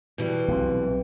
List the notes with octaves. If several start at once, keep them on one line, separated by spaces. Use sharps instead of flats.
B2 E3 G3
B1 C4